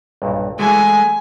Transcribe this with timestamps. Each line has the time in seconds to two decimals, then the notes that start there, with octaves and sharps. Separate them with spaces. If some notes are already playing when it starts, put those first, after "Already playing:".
0.22 B1 G2 A#2
0.59 E3 G#3 A3 E4 F#4 G#4 G#5